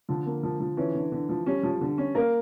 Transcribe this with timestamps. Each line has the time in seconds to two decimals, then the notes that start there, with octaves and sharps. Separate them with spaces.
0.09 D3 F3
0.26 A#3
0.43 F3
0.60 F3
0.77 E3 C#4
0.95 D3
1.12 D3
1.29 F3
1.46 G3 C#4
1.63 F3
1.81 D3
1.98 C#4
2.15 A#3 A#4